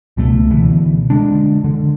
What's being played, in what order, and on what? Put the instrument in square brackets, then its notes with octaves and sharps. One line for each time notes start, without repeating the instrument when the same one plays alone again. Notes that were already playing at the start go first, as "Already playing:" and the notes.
[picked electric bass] C#2 B2 A3
B2 D3 E3
D3 G#3 D4
D3